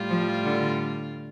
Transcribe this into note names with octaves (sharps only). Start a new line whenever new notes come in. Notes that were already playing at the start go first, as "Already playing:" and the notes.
Already playing: A2 G3 F4
F3
D3